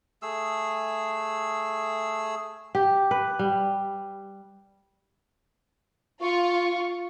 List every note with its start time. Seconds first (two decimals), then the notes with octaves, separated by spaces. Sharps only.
0.22 A3 G#4 E6
2.75 G4
3.11 B4
3.39 G3
6.21 F4 C#6